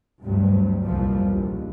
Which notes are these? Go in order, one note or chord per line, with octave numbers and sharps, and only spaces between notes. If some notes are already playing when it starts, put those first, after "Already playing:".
D2 G2 C3 F#3 G3
C2 F2 A#2 E3 F3 G3
A#1 D#2